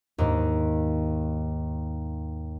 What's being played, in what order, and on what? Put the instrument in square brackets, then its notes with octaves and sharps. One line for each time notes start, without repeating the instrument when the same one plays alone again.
[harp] D#2 G#2